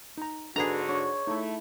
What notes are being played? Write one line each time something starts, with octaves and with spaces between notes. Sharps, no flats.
D#4 A#5
G#2 D3 D4 F#4 G#4 A4 B4 A#5
D4 C#5
A3 D#4 E4